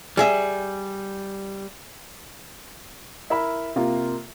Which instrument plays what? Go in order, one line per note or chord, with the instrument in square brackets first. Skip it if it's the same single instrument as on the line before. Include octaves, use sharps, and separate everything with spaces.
[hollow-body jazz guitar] G3 G#4 E5
[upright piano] E4 A#4 E5 B5
C3 A#3 F4